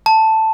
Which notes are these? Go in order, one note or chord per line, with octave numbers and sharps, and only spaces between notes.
A5